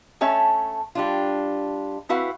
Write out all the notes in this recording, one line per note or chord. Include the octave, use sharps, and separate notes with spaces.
A3 C#4 C#5 E5 A5
G3 D4 F4
C4 E4 F#4 B4 F5